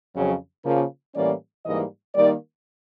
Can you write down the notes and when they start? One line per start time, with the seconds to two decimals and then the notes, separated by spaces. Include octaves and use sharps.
0.15 F2 C#3 F#3
0.65 C#3 F3 A#3
1.15 A2 E3 G3 A#3 C#4 D5
1.65 G#2 E3 G3 A#3 D#5
2.15 D#3 G3 A#3 D#4 D5